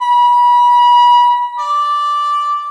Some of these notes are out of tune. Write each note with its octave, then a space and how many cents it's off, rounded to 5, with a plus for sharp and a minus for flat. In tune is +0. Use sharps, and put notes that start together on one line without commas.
B5 -30
D5 -5